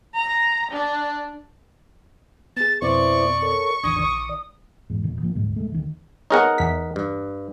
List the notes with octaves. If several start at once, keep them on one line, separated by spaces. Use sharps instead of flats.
A#5
D4
B3 G#4 A6
F2 B2 B3 C4 E4 C5 D5 C#6
A4 A#4 C#5
A1 E2 D#3 D4 G#5 D#6
A#1 D#3 D5 C#7
E2 G#2
F1 A#2 D#3
G#1 F3 A#3 D4
D#1 D2 G#2 G#3
D1 G#3 A3
D2 D#3
B3 D#4 G#4 A#4 C#5 F#5
E2 B6
G2